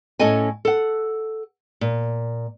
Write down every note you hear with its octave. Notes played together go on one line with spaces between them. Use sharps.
A2 C#4 E4 A4 D#5 G#5
A4 F#5
A#2